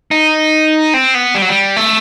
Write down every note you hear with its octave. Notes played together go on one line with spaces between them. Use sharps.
D#4
C4
B3
G3
F#3
G3
A3